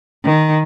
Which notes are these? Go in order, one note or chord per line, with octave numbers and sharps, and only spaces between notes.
D#3